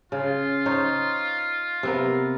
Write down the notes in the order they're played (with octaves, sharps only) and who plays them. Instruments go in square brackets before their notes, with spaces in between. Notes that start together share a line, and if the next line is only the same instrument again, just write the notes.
[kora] C#3 [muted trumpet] F4
[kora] D#4 C5 C#5
C3 B3 A#4